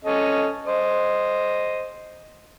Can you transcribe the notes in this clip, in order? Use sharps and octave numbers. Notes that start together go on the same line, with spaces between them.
C#4 A4 D#5
C5 D#5